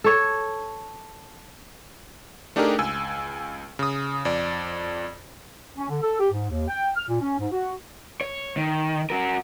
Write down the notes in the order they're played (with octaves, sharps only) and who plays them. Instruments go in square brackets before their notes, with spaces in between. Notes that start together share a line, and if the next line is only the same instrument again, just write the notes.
[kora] A4 C#5
[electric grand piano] A3 D4 D#4 G4 G#4 A#4
C#2 G#5 E6
C#3 D#6
F2 D5
[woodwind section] C#4
D3
A4
G4
G#2
D#2
G5
F6
A#2
C#4
G#2
F#4
[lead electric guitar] C#5
D#3
F#4 A#4